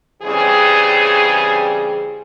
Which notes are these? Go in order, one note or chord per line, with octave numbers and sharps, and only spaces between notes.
C#3 E3 G3 C4 G#4